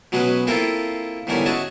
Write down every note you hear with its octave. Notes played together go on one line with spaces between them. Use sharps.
B2 F#3 G#3 C#4 B4
A#3 C4 E4 F4 A4 A#4
E2 G#2 D3 G3 A#4 C#5
C#4 F#4 G#4 D#5 E5 A5